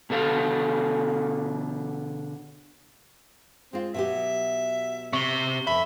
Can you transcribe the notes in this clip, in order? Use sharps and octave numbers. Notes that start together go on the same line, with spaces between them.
B2 D3 A4 F5
G#3 C4 F4
B2 F#3 G4 E5
C3 C#6 G7
F2 B2 E5 B5